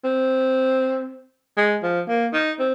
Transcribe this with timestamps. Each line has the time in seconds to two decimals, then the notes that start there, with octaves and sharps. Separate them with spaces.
0.04 C4
1.57 G#3
1.83 F3
2.08 A#3
2.33 D#4
2.59 C4